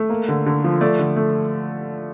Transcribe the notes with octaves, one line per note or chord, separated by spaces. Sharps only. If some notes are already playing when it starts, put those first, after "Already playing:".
Already playing: A3
A#3
D3
D3
F3
A3 D5
D3
A3